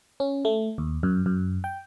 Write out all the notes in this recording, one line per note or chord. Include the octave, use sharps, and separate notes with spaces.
C#4
A3
D#2
F#2
F#2
G5